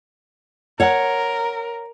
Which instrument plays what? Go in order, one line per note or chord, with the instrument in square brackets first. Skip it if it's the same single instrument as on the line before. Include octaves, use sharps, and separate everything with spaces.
[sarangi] A#4 [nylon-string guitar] C#5 F#5